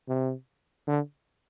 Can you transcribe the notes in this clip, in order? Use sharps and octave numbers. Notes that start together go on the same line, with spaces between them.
C3
D3